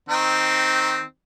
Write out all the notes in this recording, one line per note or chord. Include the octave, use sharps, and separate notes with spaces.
D#3 C4 D#4